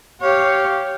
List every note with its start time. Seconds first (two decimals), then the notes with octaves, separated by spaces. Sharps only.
0.21 G4 C#5 F5